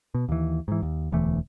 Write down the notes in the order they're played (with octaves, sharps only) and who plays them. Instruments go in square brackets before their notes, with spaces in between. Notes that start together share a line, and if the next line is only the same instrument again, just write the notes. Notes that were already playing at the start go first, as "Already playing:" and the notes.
[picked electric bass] B2
D#2 E3
G#2 E3
D#2
E1 D2 E3 A3